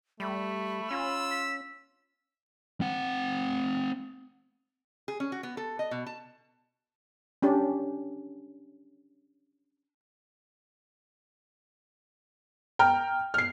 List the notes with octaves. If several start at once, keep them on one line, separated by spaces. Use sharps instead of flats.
G3 A3 B5
C#4 F4 E6
B6
C4 F#5
G#4
C#4
F#4
B3
A4
D#5
B2
A5
C#4 D4 G4
G5 A#5 F6
F6 C7